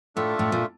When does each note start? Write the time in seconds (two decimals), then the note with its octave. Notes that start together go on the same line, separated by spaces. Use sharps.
0.16 A2 A3 D4 F4 A4 E5
0.39 A2
0.52 A#2